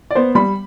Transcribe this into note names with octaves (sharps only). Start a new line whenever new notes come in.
D5
B3 C5
G3 B5